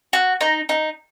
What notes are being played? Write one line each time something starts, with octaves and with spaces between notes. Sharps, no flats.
F#4
D#4
D#4